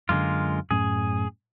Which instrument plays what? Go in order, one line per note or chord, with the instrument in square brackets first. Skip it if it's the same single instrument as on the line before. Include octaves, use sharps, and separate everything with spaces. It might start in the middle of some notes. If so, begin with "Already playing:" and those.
[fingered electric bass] F#2 D3 [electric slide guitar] G#3 A#3 F4
[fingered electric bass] F#2 A2 C#4 [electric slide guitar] G#4